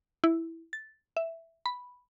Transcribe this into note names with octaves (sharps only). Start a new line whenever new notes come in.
E4
A6
E5
B5